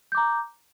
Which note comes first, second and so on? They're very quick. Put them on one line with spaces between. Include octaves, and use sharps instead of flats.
G6 D6 A#5